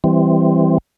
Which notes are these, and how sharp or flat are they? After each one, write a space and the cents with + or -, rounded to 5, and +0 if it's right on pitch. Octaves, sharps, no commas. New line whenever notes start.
E3 +0 G3 +0 C4 -5